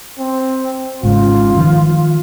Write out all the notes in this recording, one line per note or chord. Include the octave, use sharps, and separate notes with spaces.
C4
G#1 G#2 C#3 F4
D#3 F3